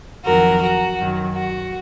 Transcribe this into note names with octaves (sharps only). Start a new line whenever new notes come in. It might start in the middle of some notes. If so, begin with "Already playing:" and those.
F2 D#3 F#3 F#4 A#4
F#4
F#2 D#3 F#3
F#4